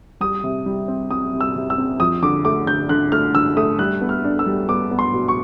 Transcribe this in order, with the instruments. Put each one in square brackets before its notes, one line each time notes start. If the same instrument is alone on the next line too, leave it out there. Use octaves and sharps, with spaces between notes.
[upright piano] G3 [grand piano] D#6
[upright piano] C3
G3
C4
[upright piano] C4 [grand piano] D#6
[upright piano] C3
[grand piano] E6
[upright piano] C3
[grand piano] E6
[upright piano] C4
[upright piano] F2 [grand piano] D#6
[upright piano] D3 [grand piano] D6
[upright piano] A3 [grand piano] D6
[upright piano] D3 [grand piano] G6
[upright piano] D3 [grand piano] F#6
[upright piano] A3 [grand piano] F6
[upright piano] D3 [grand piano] E6
[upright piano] A3 [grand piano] D#6
[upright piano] G3 [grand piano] F#6
[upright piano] B3
[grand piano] F6
[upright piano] D4
[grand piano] E6
[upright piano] G3
[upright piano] B3 [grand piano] D6
[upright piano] B3
[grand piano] C6
[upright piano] B2
[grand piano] C#6